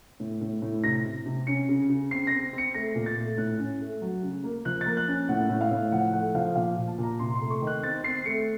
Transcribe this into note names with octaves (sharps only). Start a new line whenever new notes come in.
A2
A2
A2
C3 A#6
C3
C3
C#4 C#7
C#3
C#3
C4 C7
C4 A#6
C4 C#7
A3 A#6
A#2
A6
A3
A2 F#6
C#4
A3
F#3
C#3
A#3
F3 F#6
A#3 A6
F#6
C#4
A2 F#5
A2
F5
A2
F3 F#5
A3 F#5
F3 F5
A#2 F5
A#2
A5
A#2 A#5
C3 C6
C6
A3
C#6
D#3
F#6
C4 A6
C4 C7
A3 C#7